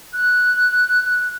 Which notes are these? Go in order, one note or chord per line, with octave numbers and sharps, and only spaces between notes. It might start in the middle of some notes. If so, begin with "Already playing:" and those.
F#6